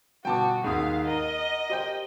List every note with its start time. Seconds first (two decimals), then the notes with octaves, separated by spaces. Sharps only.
0.25 G1 B2 F#4 G5 A5 D6
0.64 D#2 G#2 F5 F#5 D#6
1.07 A#4 D#5
1.70 G4 C5 G5